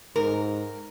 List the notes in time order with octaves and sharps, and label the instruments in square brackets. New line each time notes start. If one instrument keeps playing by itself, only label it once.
[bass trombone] G#2 [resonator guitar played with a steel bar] A#4